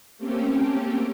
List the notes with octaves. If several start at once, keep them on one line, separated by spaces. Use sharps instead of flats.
A3 A#3 C4 C#4 G4